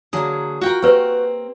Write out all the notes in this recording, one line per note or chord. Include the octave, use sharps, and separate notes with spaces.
D3 F#3 A#3 G#4
F4 F#4 A#4 G5
A#3 C4 G4 B4 C#5